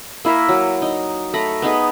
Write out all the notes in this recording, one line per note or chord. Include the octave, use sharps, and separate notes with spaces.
A#3 E4 A#4 E5
F#3
D#4
A3 A#5 B5
B3 D#4 G#4 B4